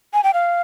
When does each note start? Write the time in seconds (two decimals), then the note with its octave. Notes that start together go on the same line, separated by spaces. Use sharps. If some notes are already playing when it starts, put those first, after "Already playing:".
0.14 G#5
0.24 G5
0.34 F5